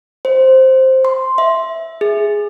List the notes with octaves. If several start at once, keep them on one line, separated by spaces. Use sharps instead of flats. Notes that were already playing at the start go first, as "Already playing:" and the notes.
C5
C6
E5
G#4